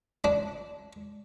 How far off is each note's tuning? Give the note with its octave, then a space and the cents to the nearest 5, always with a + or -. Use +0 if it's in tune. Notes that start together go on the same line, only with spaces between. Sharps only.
D4 -15